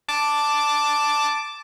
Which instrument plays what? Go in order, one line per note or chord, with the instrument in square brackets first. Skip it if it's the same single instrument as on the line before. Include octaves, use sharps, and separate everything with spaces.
[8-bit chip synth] A5 D6